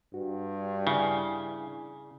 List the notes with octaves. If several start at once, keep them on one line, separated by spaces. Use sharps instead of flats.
G2 F#4
C#3 E4 D5 G#5